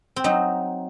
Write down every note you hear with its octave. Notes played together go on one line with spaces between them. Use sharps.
C4
F#3 D#4